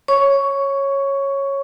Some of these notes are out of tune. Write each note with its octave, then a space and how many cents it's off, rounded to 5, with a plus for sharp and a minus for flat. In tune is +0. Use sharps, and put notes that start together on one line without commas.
C#5 -10 C#6 +10